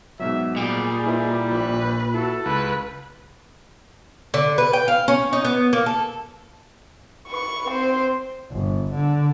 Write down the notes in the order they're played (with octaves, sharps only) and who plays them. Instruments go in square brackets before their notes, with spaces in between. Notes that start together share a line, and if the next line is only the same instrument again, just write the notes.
[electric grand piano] G#2 B2 F#3 [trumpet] E5
[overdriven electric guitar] A#2 [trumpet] G3 [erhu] G#4
[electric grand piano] E4 B4 D#5
[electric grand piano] A#1 [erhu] B4
[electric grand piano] E4 F#4 [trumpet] A4
[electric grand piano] C#2 F#6 [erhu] B4
[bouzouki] D3
B4
G5
F5
C#4
D#4
B3
A#3
A4
[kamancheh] B4 C#6
C4 C5
[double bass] G1
D3